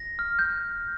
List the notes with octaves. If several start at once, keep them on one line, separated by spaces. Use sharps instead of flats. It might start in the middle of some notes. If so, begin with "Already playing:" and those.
Already playing: A#6
F6
G6